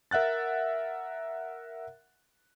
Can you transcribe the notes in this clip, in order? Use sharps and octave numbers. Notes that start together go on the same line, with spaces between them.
A#4 E5 F#5 F#6 A6